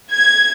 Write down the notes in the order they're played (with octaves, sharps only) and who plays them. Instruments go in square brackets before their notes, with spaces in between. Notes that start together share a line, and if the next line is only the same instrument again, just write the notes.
[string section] G#6